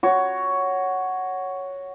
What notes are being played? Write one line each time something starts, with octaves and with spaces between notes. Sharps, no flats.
F#4 C#5